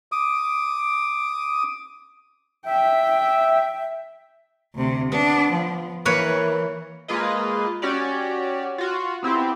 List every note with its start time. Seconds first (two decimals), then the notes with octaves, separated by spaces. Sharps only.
0.12 D6 D#6
2.66 E5 G5
4.75 D2 C3
5.12 B3 D4
5.51 F3
6.05 E3 A#3 B4 C#5
7.08 G#3 A#3 F4 G#4 B4 D#5
7.82 C#4 F#4 G4 C#5 D5
8.78 F4 F#4
9.23 B3 C4 E4 G4